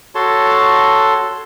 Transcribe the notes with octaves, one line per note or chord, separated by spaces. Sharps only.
F#4 A4 C#5 A5 C6